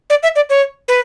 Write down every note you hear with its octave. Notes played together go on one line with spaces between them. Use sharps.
D5
E5
D5
C#5
B4